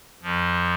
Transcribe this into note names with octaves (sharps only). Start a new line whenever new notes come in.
F2 F3